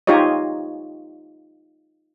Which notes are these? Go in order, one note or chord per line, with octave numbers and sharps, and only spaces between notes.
D#4 F4 G4 C#5 D#5